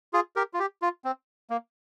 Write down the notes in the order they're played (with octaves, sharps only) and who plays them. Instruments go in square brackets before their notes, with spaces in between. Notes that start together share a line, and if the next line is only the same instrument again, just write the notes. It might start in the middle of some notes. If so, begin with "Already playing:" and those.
[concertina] F4 G#4
G4 A#4
F4
G4
F4
C4
A#3